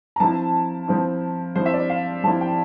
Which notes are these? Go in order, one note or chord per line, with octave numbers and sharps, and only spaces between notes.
A#5
F3 C4 E4 A5
F3 C4 E4
F3 C4 E4 C5
E5
D5
F5
F3 C4 E4 A5
G5